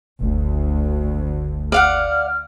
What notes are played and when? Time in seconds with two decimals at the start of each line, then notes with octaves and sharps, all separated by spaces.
0.21 F#1 D2
1.72 D5 F5 F#5 F6